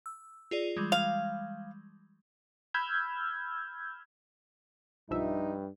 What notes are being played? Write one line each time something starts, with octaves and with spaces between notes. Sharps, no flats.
E6
F4 G#4 D5
E3 G3 G#3
F5
B5 E6 F6 G6 G#6
B1 G2 F3 D#4 E5